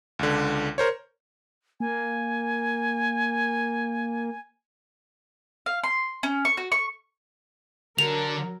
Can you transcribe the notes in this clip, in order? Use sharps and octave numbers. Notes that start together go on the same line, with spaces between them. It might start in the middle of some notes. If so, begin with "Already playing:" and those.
C#2 D3
A#4 C5 C#5
A#3 G#5
F5
C6
C#4
C#6
F#4
C#6
D3 F#3 A#4 F7